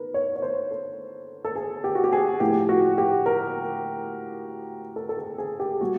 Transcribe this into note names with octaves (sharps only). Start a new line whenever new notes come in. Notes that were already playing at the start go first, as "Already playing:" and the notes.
Already playing: D#3 A#4 B4
C#5
C#5
C5
A4
A4
G#4
G4
F#4
G4
G#4
A2 F3 G4
F#4
G4
A#4
A4
A4
G#4
G#4
G4
A#2 G3 F#4